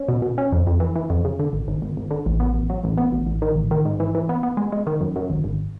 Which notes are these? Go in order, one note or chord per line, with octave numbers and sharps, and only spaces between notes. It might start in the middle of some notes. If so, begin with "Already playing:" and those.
Already playing: C#4
B2
B2
C#4
F2
F2
E3
E3
F2
C#3
D3
G#1
G#1
G#1
G#1
D3
A1
B3
A1
F#3
A1
B3
A1
A1
D#3
A1
D#3
G#2
E3
E3
B3
B3
G#3
G#3
D#3
F#2
F#2
G#1
G#1